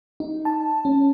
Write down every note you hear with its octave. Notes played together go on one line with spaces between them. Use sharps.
D#4
A5
C#4